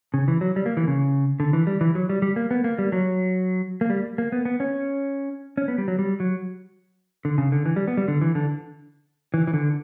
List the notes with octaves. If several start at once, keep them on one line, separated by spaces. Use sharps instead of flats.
C#3
E3
F#3
G3
A#3
E3
C#3
D3
E3
G3
E3
F#3
G3
G3
A#3
B3
A#3
G3
F#3
A#3
G3
A#3
B3
B3
C#4
C#4
B3
G3
F#3
G3
F#3
D3
C#3
D3
E3
G3
B3
G3
D3
E3
D3
E3
E3
D3